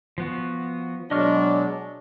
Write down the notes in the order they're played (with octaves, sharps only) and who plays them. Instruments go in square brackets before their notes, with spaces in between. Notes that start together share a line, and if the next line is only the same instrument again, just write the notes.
[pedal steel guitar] F3 B3 F#4
[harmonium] B2 F#3 G#3 [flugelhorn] D4 [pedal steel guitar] D#5 C#6 F6